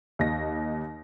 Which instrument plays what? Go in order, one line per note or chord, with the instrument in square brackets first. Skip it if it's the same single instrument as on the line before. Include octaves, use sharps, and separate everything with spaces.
[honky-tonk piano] D#2 D#5 A#6